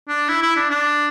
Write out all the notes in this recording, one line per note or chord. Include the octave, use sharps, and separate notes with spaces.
D4
E4
E4
D4
D4